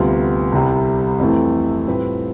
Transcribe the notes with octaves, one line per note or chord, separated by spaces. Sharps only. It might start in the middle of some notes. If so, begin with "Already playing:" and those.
Already playing: D2 C3 G3 B3 F4
C2 C3 G3
F2 C3 E3 A3
A2 G3 C4 F4 B4